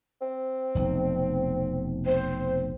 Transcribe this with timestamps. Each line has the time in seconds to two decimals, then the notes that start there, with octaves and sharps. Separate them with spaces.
0.21 C4
0.75 F1 B1
2.06 C4 C5